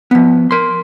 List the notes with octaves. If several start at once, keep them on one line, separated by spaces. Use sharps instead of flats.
F3 B3
A#4 C6